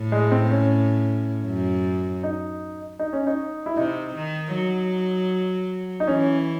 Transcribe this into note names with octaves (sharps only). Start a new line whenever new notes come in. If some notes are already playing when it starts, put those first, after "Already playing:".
Already playing: A2
G#3
C4
C#4
F#2
D#4
D#4
C#4
D#4
E4
C3 D#4
D#3
F#3
D#4
E3 C#4